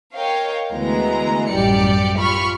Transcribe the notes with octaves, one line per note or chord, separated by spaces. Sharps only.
A#4 C#5 D#5 F5 G5
D2 E3 G#3 B3 A#5
A1 F#2 G3 G4 D5 C#7
F4 B5 C#6 F6